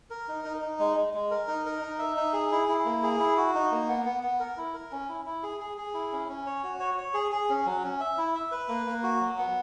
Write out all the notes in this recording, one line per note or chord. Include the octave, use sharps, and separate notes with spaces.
A#4
D#4
D#4
D#4
G#3
G#3
G#3
A#4
D#4
A#4
D#4
E5
D#4
G#4
E4
E4
A#3
G#4
E4
F#4
D#4
A#3
B3
B3
B3
A#4
E4
A#4
C#4
E4
E4
G#4
G#4
G#4
E4
C#4
C#4
C#5
F#4
C#5
C#5
G#4
G#4
C#4
F#3
C#4
E5
E4
E5
B4
A#3
A#3
F#4
F#3
B3